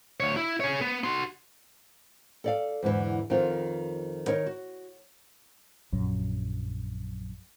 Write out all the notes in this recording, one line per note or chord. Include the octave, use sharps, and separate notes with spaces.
D2 C#5
E4
G#4 C#5
B3
F#4 C6
A4 D5 F5
E2 G#2 D3 E3
F2 D#3 B3 F4
D#3 D#4 A#4 C#5
F#4
A#1 F#2 F#3